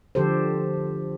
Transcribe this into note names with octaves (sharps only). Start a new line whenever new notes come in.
D3 F3 G4 A4 C5